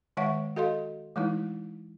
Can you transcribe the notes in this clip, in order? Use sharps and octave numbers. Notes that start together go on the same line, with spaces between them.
D#3 G#3 C#5 E5 F#5 C#6
F#4 A4 D#5 F5 C6
E3 G#3 A3 D#4 E4